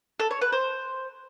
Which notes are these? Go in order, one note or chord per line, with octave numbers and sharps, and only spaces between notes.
A4
C#5
B4
C5